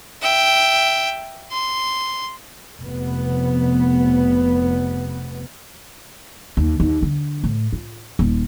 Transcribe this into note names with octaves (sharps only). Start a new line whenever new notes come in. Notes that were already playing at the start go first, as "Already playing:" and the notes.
E5 G5
C6
F1 B3
D#2
D#2
D3
A2
F4
D#1